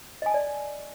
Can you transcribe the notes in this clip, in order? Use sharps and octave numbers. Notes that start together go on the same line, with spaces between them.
D5 D#5 G#5 A5